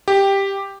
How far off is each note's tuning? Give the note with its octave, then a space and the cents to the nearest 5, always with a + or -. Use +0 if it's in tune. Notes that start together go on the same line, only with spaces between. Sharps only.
G4 +5